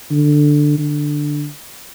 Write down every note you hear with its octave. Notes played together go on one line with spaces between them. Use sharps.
D3
D3